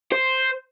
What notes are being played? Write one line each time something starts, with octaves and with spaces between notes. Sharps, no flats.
C5